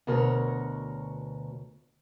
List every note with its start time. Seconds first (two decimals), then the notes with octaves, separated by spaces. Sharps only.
0.07 D2 B2 F#4 A#4 C#5